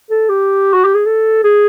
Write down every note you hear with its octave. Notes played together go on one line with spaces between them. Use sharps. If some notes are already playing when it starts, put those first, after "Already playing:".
A4
G4
F#4
G4
G#4
A4
G#4